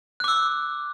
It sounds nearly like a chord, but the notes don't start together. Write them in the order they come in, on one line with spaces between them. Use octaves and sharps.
F#6 D6 E6